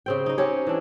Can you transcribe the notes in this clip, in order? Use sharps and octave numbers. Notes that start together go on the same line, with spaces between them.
C#3 C4 G5
D#4 D#5
C4 C#4 G4 C#5
E3 D4